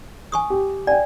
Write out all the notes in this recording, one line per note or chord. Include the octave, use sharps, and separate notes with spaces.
G#5 C#6 D#6
G4
D5 G5 G#5